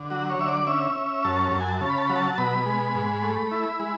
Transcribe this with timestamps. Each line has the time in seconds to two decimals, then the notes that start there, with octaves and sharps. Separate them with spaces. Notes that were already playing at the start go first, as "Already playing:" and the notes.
Already playing: D3
0.10 F#3 F#4
0.30 C#5
0.39 D3 E5
0.48 D5
0.67 C#4 E5
0.95 C#4
1.24 F#2 A5
1.52 F#2 A5
1.60 G#5
1.68 A5
1.81 C#3 A5
1.90 B5
1.98 A5
2.07 F#3 B5
2.16 A5
2.38 B2 B5
2.66 G#3
2.95 G#2
3.23 A3
3.51 E4
3.80 G#3